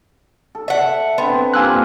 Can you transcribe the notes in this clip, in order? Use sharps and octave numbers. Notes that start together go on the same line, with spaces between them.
A4
E5 F#5
D3 B3 C4 C6
G2 A#3 F4 G#5 E6 F#6